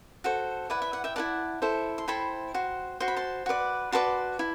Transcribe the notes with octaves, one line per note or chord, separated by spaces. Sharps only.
F#4 A4 C5
E4 B4 D5 F#5
E5
F#5
E5 G5
E4 B4 D5 F#5 A5
E4 A4 C5
C6
E4 A4 C5 G5 B5
F#4 C5
F#4 C5 C6
B5
A5 C6
F#4 B4 D5
F#4 B4 D5 A5 C6
E4